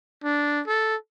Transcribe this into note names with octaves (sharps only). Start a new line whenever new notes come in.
D4
A4